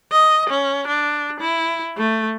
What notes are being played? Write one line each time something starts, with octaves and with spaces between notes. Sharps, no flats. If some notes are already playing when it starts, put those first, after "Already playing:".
D#5
C#4
D4
E4
A3